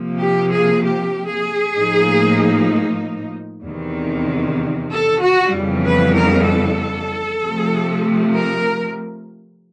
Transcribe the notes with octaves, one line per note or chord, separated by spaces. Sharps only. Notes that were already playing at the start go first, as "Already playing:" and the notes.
Already playing: C3 F3 A#3
G4
G#4
G4
G#4
A2 F3 A#3 D#4
E2 C3 D#3
A4
F#4
F2 C#3 E3 G3 B3
B4
A#4
A4
C3 F3 A3
A#4